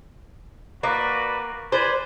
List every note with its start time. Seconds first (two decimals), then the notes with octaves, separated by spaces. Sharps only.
0.83 A#3 F#4 B4 D5
1.72 B4 C5 D5 G#5